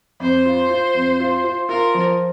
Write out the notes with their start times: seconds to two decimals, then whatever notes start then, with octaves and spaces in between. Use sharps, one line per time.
0.20 F2 C5
0.45 F4
0.70 F4
0.95 F2
1.20 F4
1.44 F4
1.69 F4 A#4
1.94 F3